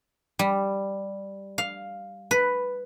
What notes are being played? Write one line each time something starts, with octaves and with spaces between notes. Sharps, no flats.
G3
F5
B4